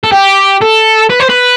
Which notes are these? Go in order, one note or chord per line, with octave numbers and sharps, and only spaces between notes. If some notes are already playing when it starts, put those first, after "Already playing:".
A4
G4
A4
B4
C5
B4